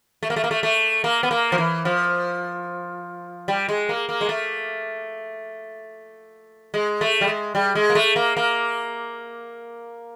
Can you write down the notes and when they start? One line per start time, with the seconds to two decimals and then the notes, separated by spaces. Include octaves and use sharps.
0.23 A3
0.30 A#3
0.36 A3
0.44 A#3
0.51 A3
0.63 A3
1.04 A#3
1.23 B3
1.31 A#3
1.52 F3
1.58 E3
1.85 F3
3.48 G3
3.69 G#3
3.89 A#3
4.09 A#3
4.21 G#3
4.29 A3
6.74 G#3
7.01 A3
7.21 G3
7.28 G#3
7.55 G3
7.75 G#3
7.90 A#3
7.95 A3
8.16 A#3
8.37 A#3